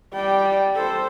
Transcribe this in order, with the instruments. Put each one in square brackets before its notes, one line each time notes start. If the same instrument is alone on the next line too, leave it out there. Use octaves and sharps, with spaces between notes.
[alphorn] G3 [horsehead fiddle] D5 G5
[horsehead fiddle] A4 C5